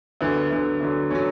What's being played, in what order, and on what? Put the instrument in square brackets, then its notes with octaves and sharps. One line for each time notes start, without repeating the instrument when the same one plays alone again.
[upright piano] D2 D3 F#3 B3
D2 D3 F#3
D2 D3 F#3
D3 F#3 C#4